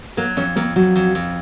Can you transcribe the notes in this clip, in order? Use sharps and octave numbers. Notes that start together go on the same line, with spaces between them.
F#3 A#3 A#4
F2 C#4 C#5
F2 A#3 A#4
F2 F#3 F#4
F2
F2